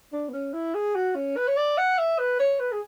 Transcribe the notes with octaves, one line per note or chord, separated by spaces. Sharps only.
D4
B3
C#4
E4
G#4
F#4
C#4
B4
C#5
D5
F#5
E5
B4
C#5
B4
G#4